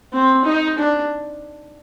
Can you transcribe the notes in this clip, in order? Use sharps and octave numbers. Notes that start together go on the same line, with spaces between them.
C4
D#4
D4